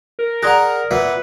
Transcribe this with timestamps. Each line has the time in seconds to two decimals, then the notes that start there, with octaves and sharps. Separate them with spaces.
0.19 A#4
0.43 G#4 D5 F#5 A#5 C6 D#6 F#6 A#6
0.91 A#2 B3 B4 E5